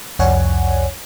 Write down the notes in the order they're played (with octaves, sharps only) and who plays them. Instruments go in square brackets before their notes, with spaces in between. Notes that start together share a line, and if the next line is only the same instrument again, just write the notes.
[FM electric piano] C2 F2 C#5 D5 F#5 G#5